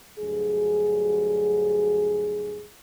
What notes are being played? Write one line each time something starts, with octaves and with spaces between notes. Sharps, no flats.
D2 G2 F#3 G#4